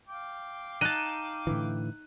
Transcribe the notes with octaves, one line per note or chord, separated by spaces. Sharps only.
F5 G5 D6
D#4 A5 F#6 D#7
A2 D3 E3